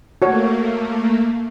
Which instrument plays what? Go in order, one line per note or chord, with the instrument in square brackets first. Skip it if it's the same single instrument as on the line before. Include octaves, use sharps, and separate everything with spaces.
[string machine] A3 A#3 [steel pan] F#4 C#5